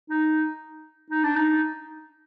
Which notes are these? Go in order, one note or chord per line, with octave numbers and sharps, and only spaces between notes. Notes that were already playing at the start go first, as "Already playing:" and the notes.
D#4
D#4
D4
D#4